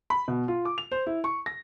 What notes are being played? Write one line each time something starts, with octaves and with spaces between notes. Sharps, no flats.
B5
B2
F4
D6
F7
C5
E4
C#6
A#6